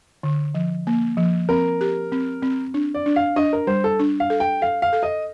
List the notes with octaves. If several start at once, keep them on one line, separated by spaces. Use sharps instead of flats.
D3
F3
A#3
F3
C4 A#4
G4
C4
C4
D4
D5
D4
F5
D4 D#5
A#4
G3 C5
A4
D4
F5
A4
G5
A4 F5
F5
A4
D#5